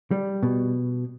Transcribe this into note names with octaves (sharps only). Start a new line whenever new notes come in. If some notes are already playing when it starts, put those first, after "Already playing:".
G3
B2